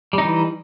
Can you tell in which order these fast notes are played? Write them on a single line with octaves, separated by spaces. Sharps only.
G3 D#4 E3